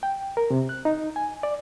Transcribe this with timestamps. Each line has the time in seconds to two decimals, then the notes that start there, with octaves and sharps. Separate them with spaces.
0.03 G5
0.37 A#4
0.50 C3
0.69 F#6
0.85 D#4
1.16 G#5
1.43 D5